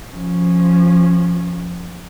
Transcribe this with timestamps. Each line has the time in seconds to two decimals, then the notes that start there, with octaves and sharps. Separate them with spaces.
0.11 F3 C#4